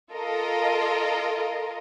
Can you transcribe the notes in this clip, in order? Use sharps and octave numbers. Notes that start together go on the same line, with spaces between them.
F4 A4 A#4 D#5